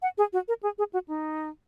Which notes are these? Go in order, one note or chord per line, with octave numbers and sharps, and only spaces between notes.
F#5
G#4
F#4
A#4
G#4
G#4
F#4
D#4